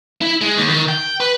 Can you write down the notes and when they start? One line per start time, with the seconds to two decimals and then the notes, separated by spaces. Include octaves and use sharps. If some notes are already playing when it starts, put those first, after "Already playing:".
0.22 E4
0.41 G#3
0.57 D#2
0.70 D#3
0.89 G5
1.20 B4